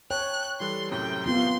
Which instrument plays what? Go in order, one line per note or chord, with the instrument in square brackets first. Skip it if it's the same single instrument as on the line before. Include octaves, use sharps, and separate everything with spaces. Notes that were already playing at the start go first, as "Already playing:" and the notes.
[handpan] C#5 [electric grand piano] G5 A5 [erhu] F#6
[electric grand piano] E3 G3 A4 [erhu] C6
[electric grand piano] F#2 A2 C3 [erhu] G5
[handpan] B3 C4 F4 [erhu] C6